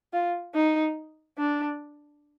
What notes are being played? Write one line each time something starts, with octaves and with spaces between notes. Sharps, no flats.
F4
D#4
D4